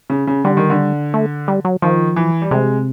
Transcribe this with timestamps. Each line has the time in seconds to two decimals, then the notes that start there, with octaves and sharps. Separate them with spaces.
0.10 C#3
0.27 C#3
0.45 D3 G3
0.57 D#3
0.70 D3
1.14 A3
1.48 G3
1.65 F#3
1.82 D#3 F3
2.16 E3
2.42 G3
2.51 C3 G#3